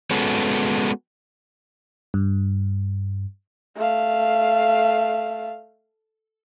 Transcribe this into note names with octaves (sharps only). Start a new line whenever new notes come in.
G#3 B3 C#4 F#4 A4
G2
A3 F5